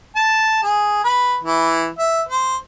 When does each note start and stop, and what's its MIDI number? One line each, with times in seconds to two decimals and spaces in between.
0.16 0.61 81
0.63 0.99 68
1.04 1.35 71
1.44 1.87 52
1.98 2.22 76
2.29 2.57 72